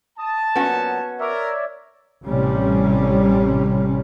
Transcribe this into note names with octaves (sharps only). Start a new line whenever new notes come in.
A5 D#6
A#2 F#3 B3 C#4 F#4
A#4 C#5 D5 E5
A1 C3 G3 C#4